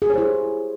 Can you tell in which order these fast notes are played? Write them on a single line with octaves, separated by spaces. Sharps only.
G#4 G4 C#5 C5 E4